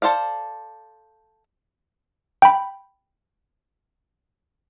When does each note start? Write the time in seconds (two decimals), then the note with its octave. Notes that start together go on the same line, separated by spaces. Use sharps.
0.02 A4 C5 D5 F5
2.42 G5 B5